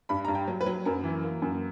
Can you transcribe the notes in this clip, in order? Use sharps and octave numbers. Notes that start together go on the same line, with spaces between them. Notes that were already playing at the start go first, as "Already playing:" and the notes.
G2 B5
G2 A#5
G5
F#3
B4
F#3
F#2 A#4
E3
A#3
F#2